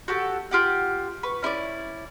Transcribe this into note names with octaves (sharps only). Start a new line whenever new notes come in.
F#4 G4 A4
F4 G4 F#5
B4 C#6
C#4 E4 C#5 D5